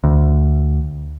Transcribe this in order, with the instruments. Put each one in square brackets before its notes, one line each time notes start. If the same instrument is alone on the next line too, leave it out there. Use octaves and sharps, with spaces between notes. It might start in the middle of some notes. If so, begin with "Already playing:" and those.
[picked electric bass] D2